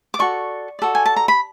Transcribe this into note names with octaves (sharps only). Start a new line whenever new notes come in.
D6
F#4 A4 D5 C#6
F#4 A4 D5
G#5
A5
A#5
B5